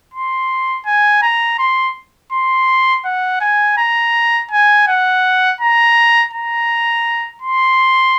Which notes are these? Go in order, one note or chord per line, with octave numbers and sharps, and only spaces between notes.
C6
G#5
A#5
C6
C6
F#5
G#5
A#5
G#5
F#5
A#5
A#5
C6